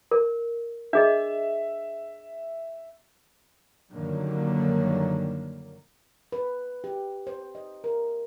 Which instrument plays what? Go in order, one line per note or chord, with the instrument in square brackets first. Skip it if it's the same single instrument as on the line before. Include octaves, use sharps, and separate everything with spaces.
[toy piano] A#4
[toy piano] D4 G#4 D#5 [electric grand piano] E5
[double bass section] F#2 D3 D#3 F#3 G3 A#3
[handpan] B4
G4
C5
D#5
A#4